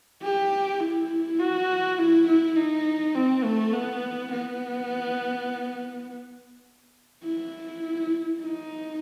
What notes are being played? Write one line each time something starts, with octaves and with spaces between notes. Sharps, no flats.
G4
E4
F#4
E4
E4
D#4
C4
A3
B3
B3
E4
D#4